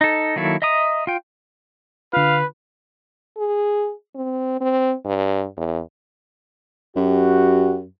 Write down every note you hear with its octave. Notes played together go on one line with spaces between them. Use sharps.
D#4 A4
D#3 F#3 A#3 E4 A4
D#5 E5 A#5 D#6
F4 G5
D3 F4 B4 F5
G#4
C4
C4
G2
E2
F#2 F#4 G4